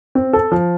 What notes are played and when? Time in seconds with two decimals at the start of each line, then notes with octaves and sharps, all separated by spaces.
0.15 C4
0.33 A4
0.52 F3